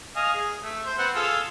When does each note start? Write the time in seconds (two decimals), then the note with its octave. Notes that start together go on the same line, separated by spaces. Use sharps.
0.16 D#5 F5 G#5
0.34 G#4
0.63 A3
0.86 C5
0.98 B3 C4 F#5
1.15 F4 G#4 A4